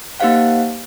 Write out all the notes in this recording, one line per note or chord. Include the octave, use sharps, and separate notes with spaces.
A#3 D#4 G4 C5 F5 F#5